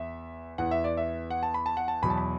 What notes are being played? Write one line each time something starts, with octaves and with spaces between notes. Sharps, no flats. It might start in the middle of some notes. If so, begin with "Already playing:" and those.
Already playing: E2 E5
E2 E3 F#5
E5
D5
E5
F#5
A5
B5
A5
F#5
A5
E2 B2 F#3 B5
A5
B5